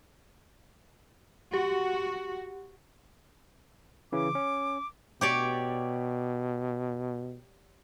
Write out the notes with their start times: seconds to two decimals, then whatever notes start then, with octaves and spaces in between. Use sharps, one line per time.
1.54 F#4 G4
4.12 C#3 E3 D6
4.35 C#4
5.21 B2 G4 C#5 D5